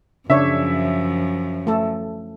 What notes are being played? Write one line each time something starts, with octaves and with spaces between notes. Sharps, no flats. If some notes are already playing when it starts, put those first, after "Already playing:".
F#2 C#3 F3 D4 C#5 E5
A3 A4